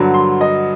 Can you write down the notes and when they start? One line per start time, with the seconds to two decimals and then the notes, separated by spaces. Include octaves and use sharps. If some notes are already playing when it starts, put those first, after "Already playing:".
Already playing: G2 D3 F#3
0.14 C6
0.41 D#5